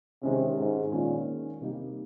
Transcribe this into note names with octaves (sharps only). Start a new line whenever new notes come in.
C3 D#3 G#3 C#4
G#2
A#2 D#3 G#3 C#4
C3 G3 A#3 D#4 G4